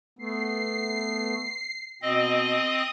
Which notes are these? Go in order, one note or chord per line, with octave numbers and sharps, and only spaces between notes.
A3 B3 C7
B2 C4 D#5 D#6